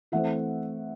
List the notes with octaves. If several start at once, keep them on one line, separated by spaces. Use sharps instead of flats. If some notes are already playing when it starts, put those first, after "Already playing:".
E3 A3 C4 E5 F#5